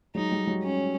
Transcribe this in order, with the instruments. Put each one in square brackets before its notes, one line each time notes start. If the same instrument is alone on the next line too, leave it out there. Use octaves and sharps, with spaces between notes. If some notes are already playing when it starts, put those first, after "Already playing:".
[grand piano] F#3 G#3 [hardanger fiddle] D#4
[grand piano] G3
F#3 G#3
[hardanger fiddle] C#4